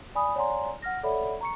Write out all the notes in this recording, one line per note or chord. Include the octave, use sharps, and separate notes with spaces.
D5 G#5 B5 D#6
C#5 D5 F#5 G#5 A#5 C6
F#5 F6 A#6
A4 C#5 D5 E5 F#5 B5
A#5 C#6 C#7